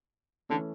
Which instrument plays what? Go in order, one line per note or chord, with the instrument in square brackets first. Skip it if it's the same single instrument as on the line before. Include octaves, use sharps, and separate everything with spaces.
[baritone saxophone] D3 [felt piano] E3 A3 C#4